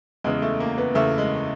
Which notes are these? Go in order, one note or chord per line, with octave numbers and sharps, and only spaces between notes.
E2 C#3 E3 G#3
A3
A#3
B3
E2 C#3 E3 A3
G#3